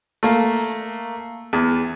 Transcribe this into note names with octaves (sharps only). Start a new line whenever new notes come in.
A3 A#3
E2